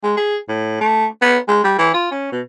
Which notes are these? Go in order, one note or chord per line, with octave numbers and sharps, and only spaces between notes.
G#3
G#4
A2
A3
B3
G#3
G3
E3
F4
C#4
B2